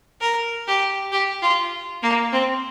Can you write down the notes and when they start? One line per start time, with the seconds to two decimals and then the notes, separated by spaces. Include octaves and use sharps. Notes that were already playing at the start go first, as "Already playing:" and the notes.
0.21 A#4
0.67 G4
1.12 G4
1.42 F4
2.03 A#3
2.32 C4